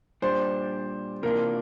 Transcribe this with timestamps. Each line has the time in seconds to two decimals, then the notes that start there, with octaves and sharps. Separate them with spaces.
0.22 A#2 G3 D4 G4 C5 D5
1.23 C3 E3 A#3 D4 F4 A#4